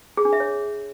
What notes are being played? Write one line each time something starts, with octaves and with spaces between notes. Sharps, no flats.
G#4
D4
E5
C#5